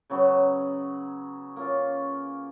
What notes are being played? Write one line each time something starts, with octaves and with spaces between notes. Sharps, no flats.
C#3 F#3 B3
A#3 C#4 F4